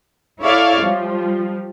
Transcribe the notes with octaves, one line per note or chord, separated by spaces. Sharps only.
E4 A4 C#5 D5 E5 F5
F3 G3